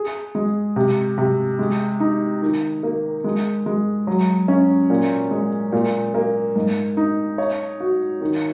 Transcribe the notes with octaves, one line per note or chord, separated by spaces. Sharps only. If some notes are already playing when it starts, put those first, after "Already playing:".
Already playing: G#4
G#3
C3
C3
G#3
D#4
D#3
A#3
G#3
G#3
F#3
C#4
A#2
G#3
A#2
A#3
G#2
D#4
C#5
F#4
D#3